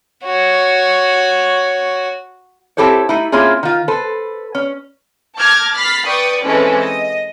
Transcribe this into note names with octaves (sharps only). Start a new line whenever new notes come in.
F#4 C#5
C4 E4 G4 A4 C5 C#5
A3 D#4 E4
A#3 C4 C#4 E4 F4 G#4
D#3 F4
A4 B4 C5
C#4
A5 D6 F6 G6 G#6 A#6
B5 F6 A6 B6 C7
B4 D5 G5 C#6 D#6
E3 G#3 C4 C#4 A4 B4
D#5